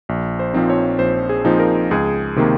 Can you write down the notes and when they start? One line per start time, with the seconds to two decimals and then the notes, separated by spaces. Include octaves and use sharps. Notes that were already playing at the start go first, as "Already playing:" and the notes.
0.09 A#1
0.39 C5
0.54 A#2 F3 C4 D#4
0.70 C#5
0.99 A#1 C5
1.29 G#4
1.44 A#2 F3 C4 D#4
1.60 A#4
1.91 C#2 G#4
2.36 C3 D#3 A#3